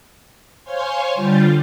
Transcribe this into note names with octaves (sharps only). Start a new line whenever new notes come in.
C5 C#5 F5 G#5 C6 C#6
D3 G3 F4 G6 A6